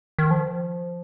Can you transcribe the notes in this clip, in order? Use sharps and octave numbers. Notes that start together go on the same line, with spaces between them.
D#3
F3